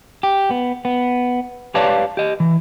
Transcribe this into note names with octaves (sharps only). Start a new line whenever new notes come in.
G4
B3
B3
G4 B4 C#5 D5 F5 A5
G4 D#5
E3